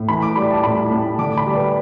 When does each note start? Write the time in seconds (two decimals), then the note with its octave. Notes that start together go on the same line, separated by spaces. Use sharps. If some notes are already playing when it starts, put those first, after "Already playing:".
Already playing: A2
0.08 E3 B5
0.22 D6
0.36 G3 B5
0.51 A5
0.64 A2 B5
0.91 A2
1.18 D3 D6
1.37 B5
1.46 G3
1.55 B4